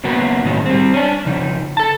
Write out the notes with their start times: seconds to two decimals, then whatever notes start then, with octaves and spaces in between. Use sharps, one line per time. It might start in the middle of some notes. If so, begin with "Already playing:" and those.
0.04 C#3 F#3 A#3 B3 F#4
0.44 A2 D#3 F#3 G#3
0.66 G3 C4
0.94 C#4 D4
1.25 F2 C#3 D#4
1.77 A4 A5